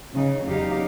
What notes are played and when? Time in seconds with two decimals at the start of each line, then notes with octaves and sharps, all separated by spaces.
0.15 C#3 D#4
0.44 E2 F#3 D#4 G4 F5